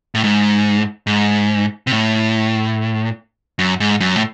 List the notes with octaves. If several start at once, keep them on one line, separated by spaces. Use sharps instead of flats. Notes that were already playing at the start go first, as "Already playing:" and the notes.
A2
G#2
G#2
C3
A2
F#2
G#2
F#2
A2